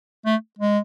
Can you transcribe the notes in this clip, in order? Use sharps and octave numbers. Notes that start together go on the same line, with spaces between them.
A3
G#3